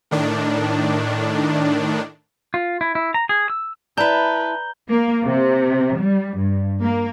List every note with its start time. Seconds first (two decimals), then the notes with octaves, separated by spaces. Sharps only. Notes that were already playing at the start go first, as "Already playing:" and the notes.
0.11 A2 D#3 D4
2.54 F4
2.81 E4
2.95 E4
3.14 A#5
3.29 G#4
3.50 E6
3.97 E4 B4 D5 A5 A#5 G6 G7
4.89 A#3
5.25 C3
5.97 G3
6.36 G2
6.80 A#3